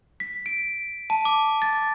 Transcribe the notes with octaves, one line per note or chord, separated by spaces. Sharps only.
B6
D7
A5
D6
A6